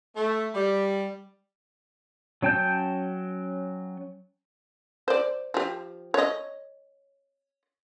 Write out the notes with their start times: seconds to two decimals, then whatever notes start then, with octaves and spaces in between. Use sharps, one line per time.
0.16 A3
0.55 G3
2.42 F#3 C#4 G5 A5 G6
5.08 C5 D5
5.54 F3 G4
6.14 C#5 D#5